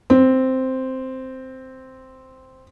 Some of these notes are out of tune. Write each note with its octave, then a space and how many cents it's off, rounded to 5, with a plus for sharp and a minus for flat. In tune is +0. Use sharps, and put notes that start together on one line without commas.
C4 -5